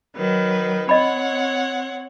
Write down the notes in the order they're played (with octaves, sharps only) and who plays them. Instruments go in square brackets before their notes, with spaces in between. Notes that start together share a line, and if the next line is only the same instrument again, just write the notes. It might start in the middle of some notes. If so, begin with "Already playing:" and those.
[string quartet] D#3 F#3 B4
[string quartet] C4 C#5 F#5 [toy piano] D#5 B5